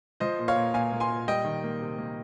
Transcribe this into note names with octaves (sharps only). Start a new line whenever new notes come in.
F3 C5 D#5
A#2
C#5 F5
A#2
A#2 F5 G#5
A#3
G#5 C6
A#2
G3 D#5 G5
D#3
A#3
C3
A#3